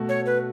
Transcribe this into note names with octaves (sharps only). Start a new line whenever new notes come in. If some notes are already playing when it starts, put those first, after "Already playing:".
Already playing: B2 A3 F#4
C#5
B4